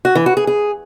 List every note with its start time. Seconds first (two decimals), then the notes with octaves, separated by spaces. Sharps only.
0.05 F#4
0.15 E3
0.26 F#4
0.37 G#4
0.47 G#4